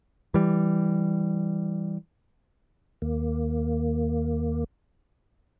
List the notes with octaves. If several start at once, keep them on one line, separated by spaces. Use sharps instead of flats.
E3 G3
D#2 A#3